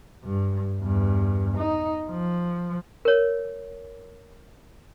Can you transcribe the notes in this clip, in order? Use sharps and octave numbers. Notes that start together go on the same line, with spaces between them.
G2
E2 G2
D#4
F3
A#4 C#5